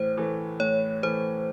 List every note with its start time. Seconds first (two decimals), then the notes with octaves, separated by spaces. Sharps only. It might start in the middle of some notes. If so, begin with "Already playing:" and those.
Already playing: A2 E3 C5
0.17 E3 A3
0.60 A2 C#5
1.03 E3 A3 C5